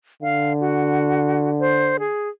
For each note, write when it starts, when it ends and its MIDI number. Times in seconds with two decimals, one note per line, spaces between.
0.22 2.08 50
0.22 0.53 77
0.60 1.49 66
1.60 1.97 72
1.99 2.28 68